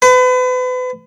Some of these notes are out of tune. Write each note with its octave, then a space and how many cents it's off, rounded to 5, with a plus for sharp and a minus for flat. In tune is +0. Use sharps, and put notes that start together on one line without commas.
B4 +35